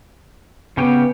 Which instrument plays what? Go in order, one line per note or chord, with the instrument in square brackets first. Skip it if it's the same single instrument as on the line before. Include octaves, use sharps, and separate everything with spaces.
[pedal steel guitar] C#3 C#4 G4 [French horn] B3